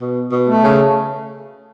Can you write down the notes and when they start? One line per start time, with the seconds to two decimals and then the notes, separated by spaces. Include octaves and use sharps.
0.01 B2
0.32 B2
0.48 A3
0.63 C#3